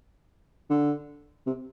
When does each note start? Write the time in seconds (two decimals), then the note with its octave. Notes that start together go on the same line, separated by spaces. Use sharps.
0.70 D3
1.46 C3